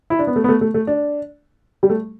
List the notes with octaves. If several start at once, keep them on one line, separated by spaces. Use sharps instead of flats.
E4
D4
B3
A3
B3
A3
A3
A3
D4
G3
A3